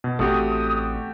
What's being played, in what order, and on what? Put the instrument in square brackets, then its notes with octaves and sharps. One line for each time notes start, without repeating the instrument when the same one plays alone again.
[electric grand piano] B2
[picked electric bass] A1 C4 [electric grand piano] A3 F#4 G4 [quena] D#6